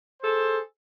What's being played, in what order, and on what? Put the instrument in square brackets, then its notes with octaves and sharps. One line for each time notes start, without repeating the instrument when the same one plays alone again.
[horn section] G#4 A4 C5